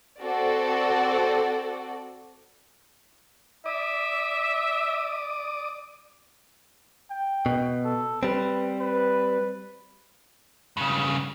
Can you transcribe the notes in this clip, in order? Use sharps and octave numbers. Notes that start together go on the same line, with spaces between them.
C4 F#4 A4 D5
D5 E5 D6 D#6
G5
B2
A4
G3 C4 B4
B4
G2 C#3